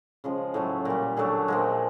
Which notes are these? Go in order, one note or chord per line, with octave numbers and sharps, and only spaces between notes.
C#3 F3 G#3
A2 F#3 A3
A#2 G3
D3 F#3 A3 G#4
A#2 F3 G#3